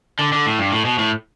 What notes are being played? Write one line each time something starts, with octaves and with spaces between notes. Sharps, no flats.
D3
D3
A2
G2
A2
B2
A2